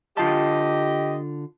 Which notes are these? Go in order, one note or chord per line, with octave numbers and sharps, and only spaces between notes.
D3 F4 G4 D#5 A5